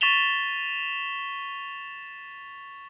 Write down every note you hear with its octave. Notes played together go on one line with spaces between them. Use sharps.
C#6 A6 B6 E7 F7 G7